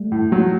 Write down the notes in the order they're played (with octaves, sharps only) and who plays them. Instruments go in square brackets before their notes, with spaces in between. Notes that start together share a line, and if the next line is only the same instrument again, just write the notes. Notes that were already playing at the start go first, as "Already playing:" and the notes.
Already playing: [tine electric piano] G3 A3
[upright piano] A2
F#3